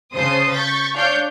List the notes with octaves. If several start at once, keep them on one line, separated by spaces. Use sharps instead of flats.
C#3 C5 A5 D#6 C7
C#6 G6 A6 B6
D4 C#5 F5 F6 G6